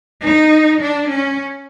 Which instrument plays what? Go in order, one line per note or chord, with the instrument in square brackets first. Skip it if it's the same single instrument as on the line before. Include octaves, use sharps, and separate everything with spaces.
[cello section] D#4
D4
C#4